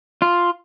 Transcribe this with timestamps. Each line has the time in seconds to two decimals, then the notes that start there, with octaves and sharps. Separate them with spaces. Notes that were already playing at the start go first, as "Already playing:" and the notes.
0.22 F4